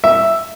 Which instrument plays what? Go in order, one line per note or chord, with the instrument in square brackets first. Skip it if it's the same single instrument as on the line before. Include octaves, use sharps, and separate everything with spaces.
[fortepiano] E5